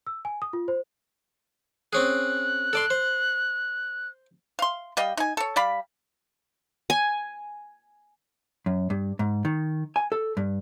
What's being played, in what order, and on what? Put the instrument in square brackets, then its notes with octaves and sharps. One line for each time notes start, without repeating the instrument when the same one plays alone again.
[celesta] E6
G#5
D#6
F4
C5
[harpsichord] C4 C#4 G#4 [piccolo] F#6
[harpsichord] A4 D5 C6
C5
[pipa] F5 C6
G3 D#5 F5 G5
D#4 G#5
A4 C#5
G3 D5 F5 B5
[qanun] G#5
[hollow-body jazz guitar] F#2
G2
G#2
D#3
G#5
A4
G2